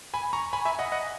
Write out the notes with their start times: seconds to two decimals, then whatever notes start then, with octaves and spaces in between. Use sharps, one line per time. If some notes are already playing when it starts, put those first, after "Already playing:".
0.14 G#5 B5
0.33 A#5 C#6
0.53 G#5 B5
0.65 E5 G#5
0.79 D#5 F#5
0.92 D#5 F#5